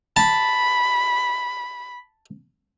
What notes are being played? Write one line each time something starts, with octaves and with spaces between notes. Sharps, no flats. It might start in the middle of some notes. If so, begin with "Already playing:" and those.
A5 B5